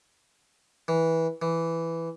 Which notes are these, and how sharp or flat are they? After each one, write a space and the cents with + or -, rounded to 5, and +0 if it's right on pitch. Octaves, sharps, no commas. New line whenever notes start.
E3 -15
E3 +5